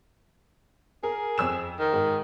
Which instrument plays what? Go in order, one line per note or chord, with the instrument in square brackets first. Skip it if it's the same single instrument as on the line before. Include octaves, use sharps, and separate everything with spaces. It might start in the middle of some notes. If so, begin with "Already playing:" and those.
[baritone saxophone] G#4 [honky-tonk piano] A#4
[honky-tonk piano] F2 E6 E7
[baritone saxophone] D#3
[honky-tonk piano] G#2